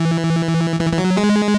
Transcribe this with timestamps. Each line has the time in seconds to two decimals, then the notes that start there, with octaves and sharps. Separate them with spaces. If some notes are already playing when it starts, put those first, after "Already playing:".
Already playing: E3
0.80 E3
0.93 E3
0.98 F#3
1.17 G#3